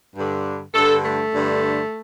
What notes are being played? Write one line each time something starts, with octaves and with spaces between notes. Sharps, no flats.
G2 D3
G2 D3 A4
A3
G2 D3